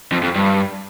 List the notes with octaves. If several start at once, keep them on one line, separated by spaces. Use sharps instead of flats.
F2
F2
G2